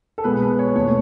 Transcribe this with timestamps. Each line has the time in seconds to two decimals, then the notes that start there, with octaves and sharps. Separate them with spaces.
0.18 A4
0.24 B2 G#3 B3 B4
0.42 B4
0.59 C#5
0.76 E2 B2 A3 C#5